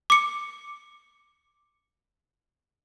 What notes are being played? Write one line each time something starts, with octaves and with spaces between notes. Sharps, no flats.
D6 C#7